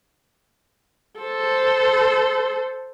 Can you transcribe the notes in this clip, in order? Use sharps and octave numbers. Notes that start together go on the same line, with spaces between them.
A4 C5